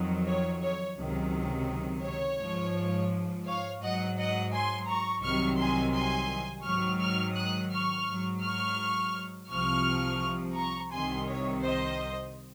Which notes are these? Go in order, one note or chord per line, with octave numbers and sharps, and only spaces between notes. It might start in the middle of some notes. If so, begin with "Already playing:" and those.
Already playing: F2 D#3 F#3
C#5
C#5
C#2 C3 D#3 F#3
C#5
G#2 F3
C#5 F5
G#2 F#3 D#5 F#5
D#5 F#5
G#5 C6
A#5 C#6
C2 C3 D#3 F#3 C#6 F6
G#5 C6
G#5 C6
G#2 D#3 F#3 C#6 F6
C#6 F6
D#6 F#6
C#6 F6
G#2 F#3
C#6 F6
C2 C3 F3 C#6 F6
A#5 C#6
C2 C3 D#3 G#5 C6
C#5
C5 D#5